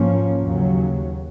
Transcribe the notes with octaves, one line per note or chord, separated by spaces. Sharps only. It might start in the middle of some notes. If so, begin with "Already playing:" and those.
Already playing: G#2 F3 A#3 C#4
D#2 C#3 F#3